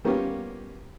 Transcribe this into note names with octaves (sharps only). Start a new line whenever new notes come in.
G3 A#3 B3 C#4 F4 G4